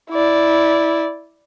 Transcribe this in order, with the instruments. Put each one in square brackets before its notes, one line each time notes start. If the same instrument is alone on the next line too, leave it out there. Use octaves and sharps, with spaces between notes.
[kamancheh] E4 D5